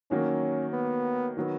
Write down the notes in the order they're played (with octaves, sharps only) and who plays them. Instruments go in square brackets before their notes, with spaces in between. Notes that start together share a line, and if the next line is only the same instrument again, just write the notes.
[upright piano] D#3 F#3 A#3 [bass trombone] C#4
[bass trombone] B3
[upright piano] D#3 F#3 B3